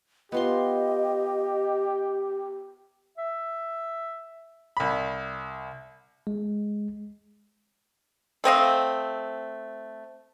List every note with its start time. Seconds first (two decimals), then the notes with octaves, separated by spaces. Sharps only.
0.32 B3 F4 G4 D#5 C6
3.18 E5
4.77 C2 B5
6.27 G#3
8.44 A3 C4 D#5 F5